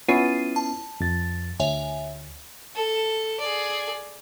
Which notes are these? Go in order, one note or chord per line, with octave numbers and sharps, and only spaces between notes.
B3 C#4 E4 F4 C7 D#7
A5
F2 A6
D2 C#5 E5 G#5
A4
G#4 D5